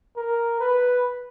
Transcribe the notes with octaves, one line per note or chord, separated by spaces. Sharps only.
A#4
B4